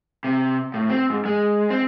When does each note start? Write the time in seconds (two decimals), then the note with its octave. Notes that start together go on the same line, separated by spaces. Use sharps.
0.24 C3
0.74 A2
0.89 C4
1.10 G#2
1.25 G#3
1.70 C4